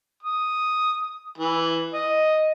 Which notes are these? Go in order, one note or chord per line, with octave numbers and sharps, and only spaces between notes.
D#6
E3
D#5